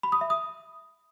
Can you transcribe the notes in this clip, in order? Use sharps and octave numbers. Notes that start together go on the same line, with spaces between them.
B5
D#6
E5
D#6